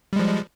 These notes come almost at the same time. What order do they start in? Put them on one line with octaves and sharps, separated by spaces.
G3 G#3 F3